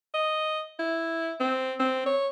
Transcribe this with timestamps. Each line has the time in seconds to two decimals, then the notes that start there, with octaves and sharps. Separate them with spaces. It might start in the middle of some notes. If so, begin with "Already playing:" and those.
0.14 D#5
0.79 E4
1.40 C4
1.79 C4
2.06 C#5